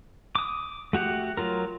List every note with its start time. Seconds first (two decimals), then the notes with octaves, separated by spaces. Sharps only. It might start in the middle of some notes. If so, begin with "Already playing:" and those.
0.35 D6 D#6
0.93 A3 F#4 G4 F#5
1.37 F#3 F4 A#4